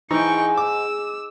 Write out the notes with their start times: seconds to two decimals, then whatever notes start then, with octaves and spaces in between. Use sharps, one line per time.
0.11 G#2 E3 D#4 G5 C#6
0.57 D6 E6